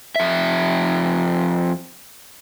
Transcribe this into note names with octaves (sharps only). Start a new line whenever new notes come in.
F2 E5